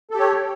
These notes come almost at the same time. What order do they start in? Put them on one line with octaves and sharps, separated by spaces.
A4 G4 C#5